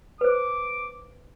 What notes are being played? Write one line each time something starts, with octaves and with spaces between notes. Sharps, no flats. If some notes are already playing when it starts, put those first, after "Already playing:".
B4 C5 D6